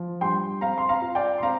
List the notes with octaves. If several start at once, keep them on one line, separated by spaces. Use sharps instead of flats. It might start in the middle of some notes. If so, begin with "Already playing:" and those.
Already playing: F3
G2 G5 C6
C4 F5 A#5
C6
F5 A#5
F4
D5 G5
C6
C4 F5 A#5